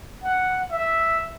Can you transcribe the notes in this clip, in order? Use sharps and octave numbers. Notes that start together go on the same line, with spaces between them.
F#5
E5